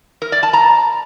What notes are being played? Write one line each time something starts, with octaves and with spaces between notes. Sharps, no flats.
A#4
D5
A5
A#5